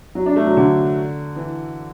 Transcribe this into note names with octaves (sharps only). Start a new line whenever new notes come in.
F#3
D4
A3
F#3
D3
E3